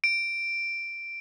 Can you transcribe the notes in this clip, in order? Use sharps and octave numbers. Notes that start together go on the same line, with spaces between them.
D7